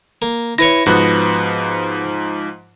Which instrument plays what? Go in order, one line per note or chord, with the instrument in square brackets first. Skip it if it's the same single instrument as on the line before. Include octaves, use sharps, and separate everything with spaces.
[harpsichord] A#3
[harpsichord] E4 B4 C#5 [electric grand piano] A#6
[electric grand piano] G#2 F3 F#6 [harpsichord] B3 F#4